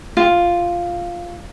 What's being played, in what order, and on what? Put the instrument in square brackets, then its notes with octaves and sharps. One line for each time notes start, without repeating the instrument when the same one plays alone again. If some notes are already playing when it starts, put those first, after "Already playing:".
[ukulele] F4